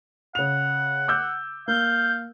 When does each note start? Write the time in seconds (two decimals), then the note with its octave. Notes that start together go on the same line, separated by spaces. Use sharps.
0.35 C#3 F#5 F7
1.08 D6 E6 G6
1.68 A#3 F5 G6